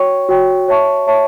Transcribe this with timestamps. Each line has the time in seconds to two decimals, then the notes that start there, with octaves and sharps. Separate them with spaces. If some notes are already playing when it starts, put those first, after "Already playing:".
Already playing: F#4 C#5 G5 C#6
0.29 F#4 C#5 G5 C#6
0.68 C#5 E5 A5 C#6
1.07 C#5 E5 A5 C#6